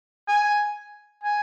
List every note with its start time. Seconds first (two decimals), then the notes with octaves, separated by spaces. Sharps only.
0.28 G#5
1.24 G#5